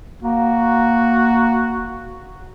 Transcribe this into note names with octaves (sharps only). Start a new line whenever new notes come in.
A#3 F#4